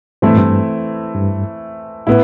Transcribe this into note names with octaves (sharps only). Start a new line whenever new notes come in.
G2 E3 A3 C4 E4
A2
G2
G2
A2 B3 E4